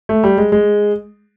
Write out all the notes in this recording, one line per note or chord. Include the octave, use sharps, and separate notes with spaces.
A3
G3
G#3
G#3